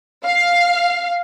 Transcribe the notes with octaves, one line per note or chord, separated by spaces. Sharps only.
F5